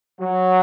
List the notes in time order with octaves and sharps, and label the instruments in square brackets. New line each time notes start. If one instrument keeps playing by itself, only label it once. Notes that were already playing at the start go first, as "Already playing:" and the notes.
[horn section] F#3